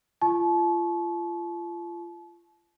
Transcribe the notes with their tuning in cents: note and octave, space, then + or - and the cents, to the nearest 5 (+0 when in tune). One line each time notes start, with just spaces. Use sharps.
F4 -30 A5 -40 C#6 -15